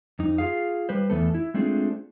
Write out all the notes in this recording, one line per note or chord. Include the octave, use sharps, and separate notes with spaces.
F2 D#4
F4 G#4 F5
G3 B4 C5
E2 A3 B3 A4
E4
G#3 A3 C4 D4 F4 G#4